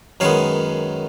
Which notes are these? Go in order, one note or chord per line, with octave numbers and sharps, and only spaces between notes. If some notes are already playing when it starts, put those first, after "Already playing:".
F#2 D#3 G#3 B3 C#5 F5